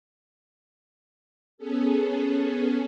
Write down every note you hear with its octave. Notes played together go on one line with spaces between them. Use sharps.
B3 C#4 G#4 A4